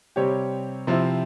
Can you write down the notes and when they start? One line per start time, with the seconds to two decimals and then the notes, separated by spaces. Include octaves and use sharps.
0.16 C3 G3 C4 G4 C#5
0.87 C3 F3 C4 E4